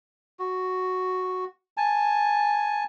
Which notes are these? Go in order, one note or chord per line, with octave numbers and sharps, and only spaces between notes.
F#4
G#5 A5